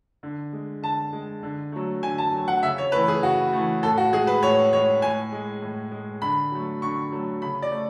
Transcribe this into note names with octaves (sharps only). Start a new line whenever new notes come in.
D3
G#3
D3 A5
G#3
D3
F#3 A3
D3 G#5
A5
F#3 A3
F#5
C#3 E5
C#5
E3 A3 B4
G#4
C#3 F#4
E3 A3
A2 A4
F#4
G#3 G#4
B4
A2 C#5
G#3 C#5
A2 G#5
G#3
A2
G#3
D3 B5
F#3 A3
D3 C#6
F#3 A3
C#3 B5
D5
A3